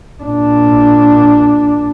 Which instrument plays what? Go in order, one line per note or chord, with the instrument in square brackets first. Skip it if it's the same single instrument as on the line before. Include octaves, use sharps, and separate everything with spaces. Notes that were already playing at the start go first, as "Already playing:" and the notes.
[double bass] A#2 D4